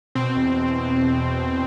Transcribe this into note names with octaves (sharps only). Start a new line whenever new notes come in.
B2 C4
E2
E2
B2
B2
B2
E2